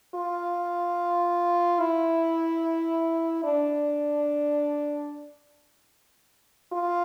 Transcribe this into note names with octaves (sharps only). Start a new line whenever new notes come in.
F4
E4
D4
F4